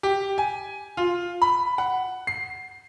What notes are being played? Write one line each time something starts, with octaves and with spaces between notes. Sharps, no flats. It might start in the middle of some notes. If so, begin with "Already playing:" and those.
G4
G#5
F4
B5
F#5
C7